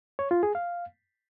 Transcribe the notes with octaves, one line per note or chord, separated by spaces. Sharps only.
C#5
F4
G#4
F5